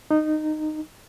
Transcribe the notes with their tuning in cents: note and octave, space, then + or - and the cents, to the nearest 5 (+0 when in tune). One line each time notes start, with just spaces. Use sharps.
D#4 -15